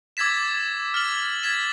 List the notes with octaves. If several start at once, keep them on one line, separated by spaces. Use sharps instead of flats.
D6 E6 G#6 A6 B6 E7
F6 A6 F#7
G#6 A6 B6 E7